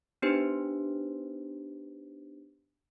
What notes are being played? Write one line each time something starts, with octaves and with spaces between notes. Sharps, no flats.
B3 D4 D#4 G4 B4 C5